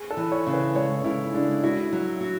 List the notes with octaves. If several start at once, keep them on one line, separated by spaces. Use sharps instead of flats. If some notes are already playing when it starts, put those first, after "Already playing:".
Already playing: G#4
A4
E3
C#5
C#3
B4
G#3 C#5
C#3 E4
G#3 D4
E4 F#4
F#3
F#4